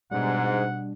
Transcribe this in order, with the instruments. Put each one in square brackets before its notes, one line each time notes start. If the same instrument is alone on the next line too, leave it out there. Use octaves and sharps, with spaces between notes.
[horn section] G#2 [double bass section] B2 [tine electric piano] G3 D4 [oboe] F#5